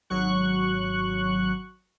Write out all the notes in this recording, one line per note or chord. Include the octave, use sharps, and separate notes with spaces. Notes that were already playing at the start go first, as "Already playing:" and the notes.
G#1 F#3 C#6 F#6